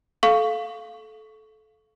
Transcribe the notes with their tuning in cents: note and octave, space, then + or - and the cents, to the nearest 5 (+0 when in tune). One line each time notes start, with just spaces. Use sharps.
A4 -25 F5 +0 C#6 +15